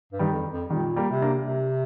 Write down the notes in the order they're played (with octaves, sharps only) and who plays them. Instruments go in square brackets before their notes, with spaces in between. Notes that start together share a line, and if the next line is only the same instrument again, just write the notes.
[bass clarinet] G2
[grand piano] D#3 G3
[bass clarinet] F2
F2
[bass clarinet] A#2 [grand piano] D#3 G3
[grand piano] G3 A#3
[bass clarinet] C3
[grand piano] A#3 D4
[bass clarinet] C3